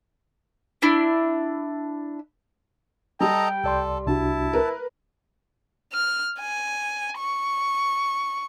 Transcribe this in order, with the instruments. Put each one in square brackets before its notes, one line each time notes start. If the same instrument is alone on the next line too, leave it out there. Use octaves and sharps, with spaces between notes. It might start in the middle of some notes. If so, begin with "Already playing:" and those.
[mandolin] D4 E4
[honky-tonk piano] G3 G4 [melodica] A4 D#5 A#5 [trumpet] G5
[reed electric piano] C2 D5 C6 [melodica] A4
[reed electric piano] C2 D4 F#4 [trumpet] E4 [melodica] A5
[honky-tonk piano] A#4 B4
[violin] F6
G#5
C#6